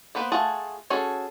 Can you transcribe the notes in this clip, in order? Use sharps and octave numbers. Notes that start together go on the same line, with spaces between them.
A#3 B3 B4 C5
A3 F4 G#4 F#5 A5
C#4 F#4 G#4 A4